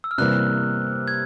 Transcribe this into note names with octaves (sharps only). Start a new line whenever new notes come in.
E6
F6
C3 E3 G3 A#3 F#6
G#6